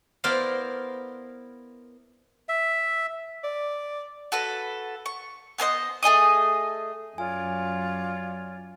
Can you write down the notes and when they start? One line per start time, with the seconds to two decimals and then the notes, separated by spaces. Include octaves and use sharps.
0.24 B3 E4 A#4 C5 D5 F5
2.49 E5
3.43 D5
4.32 F#4 A4 B4
5.06 C#6
5.58 B3 A4 C5 D#5
6.03 A3 G#4 D#5 D#6
7.18 F#2 F4 C#5 D5 G#5